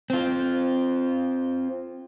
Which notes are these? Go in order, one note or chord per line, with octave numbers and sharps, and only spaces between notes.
C4 F4